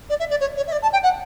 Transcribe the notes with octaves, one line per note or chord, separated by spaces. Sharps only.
D5
E5
D5
C#5
C#5
E5
D5
A5
G5
F#5